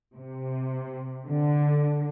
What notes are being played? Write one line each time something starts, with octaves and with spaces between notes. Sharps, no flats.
C3
D3